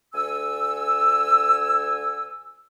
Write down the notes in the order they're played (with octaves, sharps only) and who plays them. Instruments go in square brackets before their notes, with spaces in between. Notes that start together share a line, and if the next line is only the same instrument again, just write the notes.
[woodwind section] D2 G#5 E6